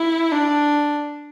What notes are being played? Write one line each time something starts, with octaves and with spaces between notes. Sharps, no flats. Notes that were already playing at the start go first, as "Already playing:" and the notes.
Already playing: E4
D4